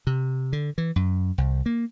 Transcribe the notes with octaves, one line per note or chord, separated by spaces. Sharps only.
C3
D3
E3
F#2
C2
A#3